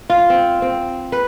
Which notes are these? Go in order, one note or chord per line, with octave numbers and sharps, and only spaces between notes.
F4
C4
C4
B4